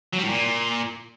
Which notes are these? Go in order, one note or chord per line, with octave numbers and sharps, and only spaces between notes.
F#3
G3
A2
A#2